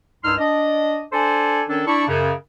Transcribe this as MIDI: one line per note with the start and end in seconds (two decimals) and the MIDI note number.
0.24 0.34 36
0.24 0.34 43
0.24 0.34 63
0.24 0.34 84
0.24 0.34 88
0.24 0.34 89
0.38 1.02 62
0.38 1.02 75
1.13 1.61 62
1.13 1.61 69
1.13 1.61 72
1.13 1.61 80
1.68 1.82 51
1.68 1.82 61
1.68 1.82 62
1.68 1.82 69
1.87 2.03 62
1.87 2.03 64
1.87 2.03 85
2.08 2.32 42
2.08 2.32 49